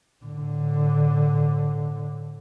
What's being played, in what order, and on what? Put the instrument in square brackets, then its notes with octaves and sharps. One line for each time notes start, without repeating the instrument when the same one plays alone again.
[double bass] A2 D3